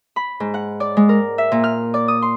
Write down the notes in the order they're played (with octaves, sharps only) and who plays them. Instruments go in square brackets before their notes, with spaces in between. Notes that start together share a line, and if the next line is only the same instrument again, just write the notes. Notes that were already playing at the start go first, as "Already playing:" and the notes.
[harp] B5
G#2
F#5
D5
G#3
A#4
E5
A#2
F6
D5
D#6
C6